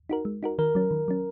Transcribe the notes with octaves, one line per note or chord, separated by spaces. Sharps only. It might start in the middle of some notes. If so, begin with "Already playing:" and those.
D#4 F#4 A#4
G#3
D#4 F#4 A#4
D#3 A#4
F#3 C#4
D#3
F#3 C#4